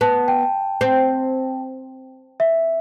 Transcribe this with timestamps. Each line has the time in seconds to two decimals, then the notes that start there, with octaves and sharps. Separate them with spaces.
0.01 B3 A5
0.28 G5
0.81 C4
2.40 E5